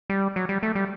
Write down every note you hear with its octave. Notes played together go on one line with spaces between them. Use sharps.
G3
F#3
G3
A3
G3